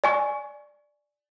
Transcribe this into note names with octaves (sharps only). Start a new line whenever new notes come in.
D5 G#5 C#6